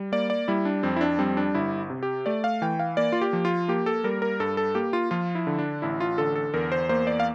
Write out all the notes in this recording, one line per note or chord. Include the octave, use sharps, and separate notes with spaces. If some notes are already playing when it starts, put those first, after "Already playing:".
Already playing: G3
A#3 D5
D5
G3 E4
D4
F2 C4
E4
D4
G3 C4
D4
G1 E4
C3
G4
A3 D5
F5
E3 G5
F5
A#3 D5
F4
G4
F3
F4
A#3 G4
A4
G3 A#4
A#4
G2 A4
A4
A#3 G4
F4
F3 F4
E4
D3
D4
A1 E4
F4
D3 A4
A4
E2 A#4
C5
A#3 C5
D5
F5